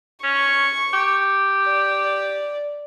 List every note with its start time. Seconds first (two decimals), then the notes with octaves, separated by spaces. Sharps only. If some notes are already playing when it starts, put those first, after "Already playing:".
0.23 C#4 C#6
0.93 G4
1.67 D5